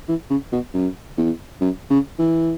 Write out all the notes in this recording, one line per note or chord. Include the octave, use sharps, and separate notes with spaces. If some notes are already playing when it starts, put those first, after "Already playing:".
E3
C#3
B2
F#2
E2
F#2
C#3
E3